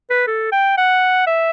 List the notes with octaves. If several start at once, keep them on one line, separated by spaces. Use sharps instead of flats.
B4
A4
G5
F#5
E5